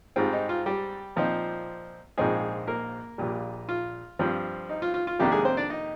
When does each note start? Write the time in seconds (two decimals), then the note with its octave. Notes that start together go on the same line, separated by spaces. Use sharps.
0.16 G#2 G3 C4 F4
0.33 D#4
0.49 F4
0.66 G3 G4
1.16 A#2 F3 C4 D#4
2.17 A#1 G#2 F3 G#3 C4 D#4 G#4
2.67 A#3 A#4
3.18 A#1 A#2 G3
3.69 F4
4.19 G2 F3 C4
4.69 D#4
4.82 F4
4.94 F4
5.07 F4
5.19 F2 C3 D#3 G3 A#3 D4 G4
5.32 G#3 G#4
5.45 C4 C5
5.57 D4 D5
5.70 D#4 D#5